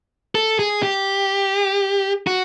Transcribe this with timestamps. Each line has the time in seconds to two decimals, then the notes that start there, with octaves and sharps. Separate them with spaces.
0.35 A4
0.59 G#4
0.83 G4
2.27 F#4